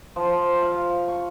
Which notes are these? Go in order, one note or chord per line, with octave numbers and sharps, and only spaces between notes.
F3
F5
C#6